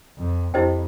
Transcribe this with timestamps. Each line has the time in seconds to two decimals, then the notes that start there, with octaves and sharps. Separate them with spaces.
0.18 F2
0.54 F2 E4 G4 C5 D#5 G5